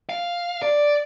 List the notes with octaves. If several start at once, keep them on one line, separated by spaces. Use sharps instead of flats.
F5
D5